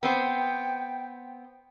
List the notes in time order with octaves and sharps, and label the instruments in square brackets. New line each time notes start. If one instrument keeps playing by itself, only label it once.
[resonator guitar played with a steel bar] B3 C4 C5 [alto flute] G5